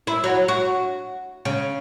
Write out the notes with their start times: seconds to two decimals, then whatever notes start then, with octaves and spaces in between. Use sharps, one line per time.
0.07 E4
0.24 F#3
0.48 F#4
1.45 C#3